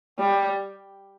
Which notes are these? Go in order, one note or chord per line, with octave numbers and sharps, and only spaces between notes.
G3